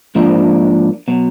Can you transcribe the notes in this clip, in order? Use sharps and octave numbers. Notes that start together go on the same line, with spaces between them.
G#2 F3 A#3 D4
B2 F#3